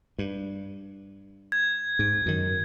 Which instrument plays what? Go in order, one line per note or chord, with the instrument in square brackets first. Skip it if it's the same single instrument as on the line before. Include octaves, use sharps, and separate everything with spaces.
[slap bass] G2
[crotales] G#6
[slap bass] G#2
F#2 D#3